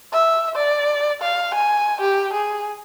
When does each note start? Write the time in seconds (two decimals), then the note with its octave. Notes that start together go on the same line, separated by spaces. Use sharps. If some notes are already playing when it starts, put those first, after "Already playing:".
0.13 E5
0.56 D5
1.22 F5
1.55 G#5
2.01 G4
2.34 G#4